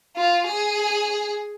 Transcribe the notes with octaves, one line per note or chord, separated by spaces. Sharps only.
F4
G#4